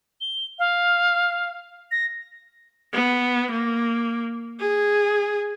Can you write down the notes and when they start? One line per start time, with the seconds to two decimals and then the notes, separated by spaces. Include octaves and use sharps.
0.21 G7
0.59 F5
1.91 A#6
2.93 B3
3.52 A#3
4.60 G#4